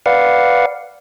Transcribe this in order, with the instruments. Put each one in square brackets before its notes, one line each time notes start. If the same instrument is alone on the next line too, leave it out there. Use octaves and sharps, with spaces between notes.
[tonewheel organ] B4 D5 F5 F#5